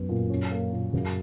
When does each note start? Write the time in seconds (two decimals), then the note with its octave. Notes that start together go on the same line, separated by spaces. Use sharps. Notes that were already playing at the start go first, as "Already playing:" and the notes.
Already playing: F#2 B3
0.09 A#2
0.30 C#4
0.51 A#3
0.73 A#2
0.93 F#2 C#3